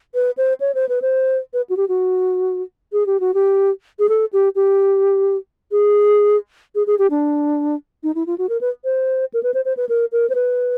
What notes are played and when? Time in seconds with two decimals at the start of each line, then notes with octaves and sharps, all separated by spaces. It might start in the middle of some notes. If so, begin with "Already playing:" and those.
0.15 B4
0.37 C5
0.60 C#5
0.75 C5
0.89 B4
1.02 C5
1.53 B4
1.69 F#4
1.77 G4
1.89 F#4
2.93 G#4
3.06 G4
3.20 F#4
3.34 G4
3.99 G#4
4.09 A4
4.33 G4
4.55 G4
5.72 G#4
6.75 G#4
6.87 G#4
6.99 G4
7.11 D4
8.03 D#4
8.15 E4
8.27 F4
8.38 F#4
8.49 A#4
8.61 B4
8.84 C5
9.34 A#4
9.43 B4
9.54 C5
9.65 C5
9.77 B4
9.89 A#4
10.12 A#4
10.30 C5
10.35 B4